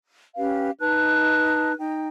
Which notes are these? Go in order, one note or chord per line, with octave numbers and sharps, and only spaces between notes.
C#4 G4 B4 F5
D#4 B4 A5 F#6
D#4 G5